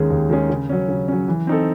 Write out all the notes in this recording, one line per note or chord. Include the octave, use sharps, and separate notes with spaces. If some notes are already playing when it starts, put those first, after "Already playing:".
Already playing: D#2 D#3 G#3 C#4 G#4
D#2
D#3 G#3 C#4 G#4
C#3
F#3 C#4
C#3
F#3 C#4
E3
C4 D#4 A4